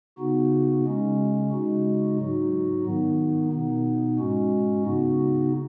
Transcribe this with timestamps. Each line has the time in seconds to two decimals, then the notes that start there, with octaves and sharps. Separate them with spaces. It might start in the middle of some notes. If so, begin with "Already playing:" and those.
0.18 C#3 B3 D#4 F#4
0.85 C#3 G#3 C#4
1.51 C#3 G#3 D#4 F#4
2.19 G#2 F#3 D#4 F#4
2.86 D#3 B3 D#4
3.52 B2 B3 D#4
4.19 G#2 G#3 C#4 F#4
4.86 C#3 B3 D#4 F#4